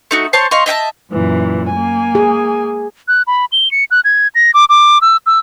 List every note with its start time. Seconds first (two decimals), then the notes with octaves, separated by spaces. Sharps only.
0.11 A3 D#4 F#4
0.33 C5 C#5 A5 C#6
0.51 D#5 F5 C6 C#6
0.66 D#5 E5 G5 A5
1.10 F#2 A#2 E3
1.69 A#3 G#5
2.15 G#4
3.08 F#6
3.27 B5
3.52 G7
3.71 C#7
3.91 F#6
4.05 G#6
4.35 A#6
4.54 D6
4.69 D6
5.01 E6
5.26 E6